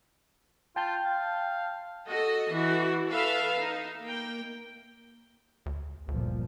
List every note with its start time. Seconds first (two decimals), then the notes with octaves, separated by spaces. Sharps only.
0.76 F4 G5 A5 G6
1.04 F5
2.08 F#4 A4 D#5
2.51 E3 F#4
3.08 A4 B4 E5 F5
3.61 D#4
4.04 A#3 G5
5.66 D2
6.08 G1 D2 A#2 F3